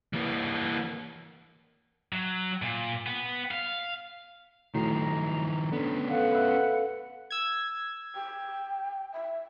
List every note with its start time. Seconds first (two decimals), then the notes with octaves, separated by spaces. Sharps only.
0.13 E3 A#3
2.13 F#3
2.62 A#2
3.07 B3
3.51 F5
4.74 A2 D#3 F3 F#3 A#5 C7
5.72 D3 B3 C#4
6.09 A4 B4 F5 F#5
6.31 E5 B5
7.31 E6 G#6
8.15 G5
9.13 E5